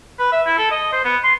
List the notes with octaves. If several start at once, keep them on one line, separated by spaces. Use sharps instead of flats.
B4
E5
E4
A4
D#5
C5
B3
C6